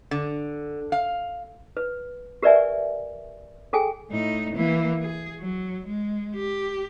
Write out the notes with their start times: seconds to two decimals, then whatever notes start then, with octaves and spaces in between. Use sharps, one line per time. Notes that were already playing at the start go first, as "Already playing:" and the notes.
0.11 D3
0.92 F5
1.77 B4
2.42 G4 A#4 B4 D5 E5 G#5
3.73 G#4 A4 G5 G#5
4.11 A2 D#4
4.53 E3 A#3
5.01 G#4
5.39 F#3
5.86 G#3
6.35 G4